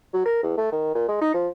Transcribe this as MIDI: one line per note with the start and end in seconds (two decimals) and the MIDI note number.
0.14 0.23 54
0.25 0.41 70
0.43 0.55 40
0.57 0.68 57
0.72 0.91 51
0.95 1.08 46
1.08 1.21 56
1.21 1.33 63
1.34 1.48 53